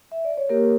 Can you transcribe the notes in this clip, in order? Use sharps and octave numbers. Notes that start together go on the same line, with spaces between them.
E5
D5
C#5
A#3 G4 A#4